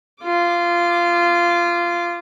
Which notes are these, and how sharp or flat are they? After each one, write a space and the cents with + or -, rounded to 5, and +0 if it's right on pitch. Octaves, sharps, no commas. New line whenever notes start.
F4 -15 D6 +0